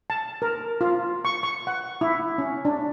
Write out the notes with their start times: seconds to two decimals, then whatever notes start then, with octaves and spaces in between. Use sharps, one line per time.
0.10 A5
0.42 A#4
0.81 F4
1.25 C#6
1.43 C#6
1.67 F#5
2.01 E4
2.38 C#4
2.65 D4